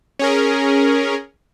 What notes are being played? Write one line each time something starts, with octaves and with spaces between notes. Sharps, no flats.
C#4 G#4 A#4